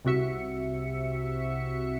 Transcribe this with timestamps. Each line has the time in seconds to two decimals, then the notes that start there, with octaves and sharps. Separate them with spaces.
0.05 C2 C3 F#4 E5 C#7